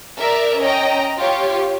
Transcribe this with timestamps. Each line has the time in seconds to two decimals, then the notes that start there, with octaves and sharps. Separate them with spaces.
0.18 A#4 D5 E5
0.60 C#4 D#5 G5 A#5
1.18 F4 G4 C#5